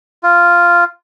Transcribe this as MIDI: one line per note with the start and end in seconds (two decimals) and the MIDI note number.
0.23 0.84 65